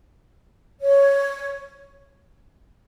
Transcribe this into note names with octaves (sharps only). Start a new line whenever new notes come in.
C#5